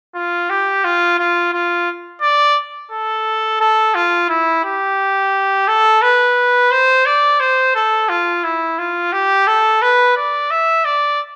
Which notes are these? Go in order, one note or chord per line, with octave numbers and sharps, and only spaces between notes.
F4
G4
F4
F4
F4
D5
A4
A4
F4
E4
G4
A4
B4
C5
D5
C5
A4
F4
E4
F4
G4
A4
B4
D5
E5
D5